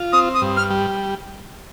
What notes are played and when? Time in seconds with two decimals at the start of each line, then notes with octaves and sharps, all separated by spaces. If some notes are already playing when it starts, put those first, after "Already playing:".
Already playing: F4
0.12 C4 D#6
0.34 D#6
0.42 G2
0.56 F6
0.70 G3